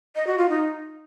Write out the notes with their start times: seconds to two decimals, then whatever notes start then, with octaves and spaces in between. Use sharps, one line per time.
0.16 D#5
0.27 F#4
0.38 F4
0.49 D#4